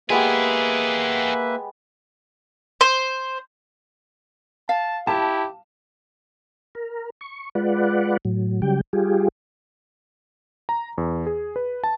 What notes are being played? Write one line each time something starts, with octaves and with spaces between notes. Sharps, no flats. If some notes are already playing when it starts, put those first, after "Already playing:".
G#3 A#3 B3 E4 G4 G#4 B4 E5
C5
F5 A5
E4 G4 A5
A#4
C#6
G#3 F4 B4 D5 F#5
A2 F#3
C#3 F#3 G3 G4 G5
G3 F4 G4 G#4
A#5
E2
G#4
B4
A5